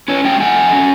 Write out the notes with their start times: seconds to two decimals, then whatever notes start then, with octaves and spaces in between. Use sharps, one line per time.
0.08 C#4 B4 C#5
0.24 A3 F5 G5
0.40 F3 F#5 G#5
0.56 A3
0.72 C#4